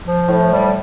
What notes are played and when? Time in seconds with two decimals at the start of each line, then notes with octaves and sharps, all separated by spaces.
0.06 F3
0.28 A2
0.51 G3